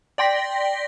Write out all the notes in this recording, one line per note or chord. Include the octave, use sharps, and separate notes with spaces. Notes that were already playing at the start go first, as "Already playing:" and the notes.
D5 G5 C6 A#6 B6